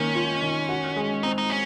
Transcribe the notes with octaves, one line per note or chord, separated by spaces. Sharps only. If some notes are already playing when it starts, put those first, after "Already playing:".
Already playing: D#3 A#3 C#4
F4
D#3
F#4
G#3
C4 D#4
D#4
C#4